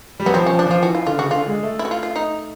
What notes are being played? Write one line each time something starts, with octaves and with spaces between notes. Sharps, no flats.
G3
F#3 B3
F3 C4
F3 C#4
D4
F3 F4
E3 F#4
F4
D3 F4
C#3 F#4
D3 F4
G#3
A3
E4
F#4
F4
F4
D#4